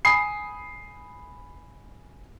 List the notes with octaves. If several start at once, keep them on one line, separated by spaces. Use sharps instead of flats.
G#5 B5 D#6 C7